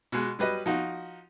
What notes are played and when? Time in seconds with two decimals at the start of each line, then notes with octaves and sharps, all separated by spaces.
0.12 B2 G#3 F#6
0.39 F#3 G3 B4 D#5
0.66 F3 D#4 F#4